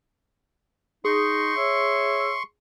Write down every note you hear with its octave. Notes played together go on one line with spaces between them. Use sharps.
D#4 G#4 C6 C#6
C#5 E5